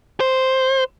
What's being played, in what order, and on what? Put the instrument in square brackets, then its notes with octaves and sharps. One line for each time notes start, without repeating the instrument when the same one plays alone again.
[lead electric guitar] C5